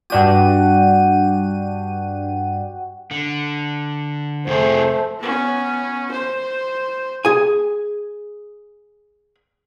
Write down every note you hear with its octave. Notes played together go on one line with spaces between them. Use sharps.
G2 D4 F#4 G4 D#7
D3
F2 C3 A3 G#4 C5
B3 C#4
C5
G#4 G#5